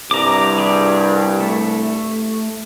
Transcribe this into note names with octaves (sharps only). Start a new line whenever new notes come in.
C2 G2 A#5 D6
G4 G#4
A3